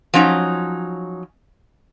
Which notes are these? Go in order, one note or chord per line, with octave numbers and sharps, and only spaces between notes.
F3 F#3 C#4 D#4